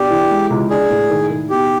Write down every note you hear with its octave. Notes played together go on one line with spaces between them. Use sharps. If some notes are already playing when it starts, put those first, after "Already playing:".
Already playing: B2 D4 G4
E3
G#3
C#2
D4 G#4
A2
D#3
D#3
B2 G4